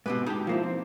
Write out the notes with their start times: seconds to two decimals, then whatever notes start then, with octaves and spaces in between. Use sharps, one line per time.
0.06 G#2 B2 C4 G4 B4
0.26 G#3 D#4 G4 A5
0.47 F3 A#3 E4
0.63 C4